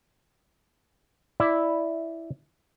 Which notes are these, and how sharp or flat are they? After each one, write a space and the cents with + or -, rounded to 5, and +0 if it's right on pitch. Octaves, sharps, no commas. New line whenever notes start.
E4 +0 D5 +0